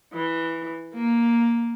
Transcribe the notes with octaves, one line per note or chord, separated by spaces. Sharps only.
E3
A#3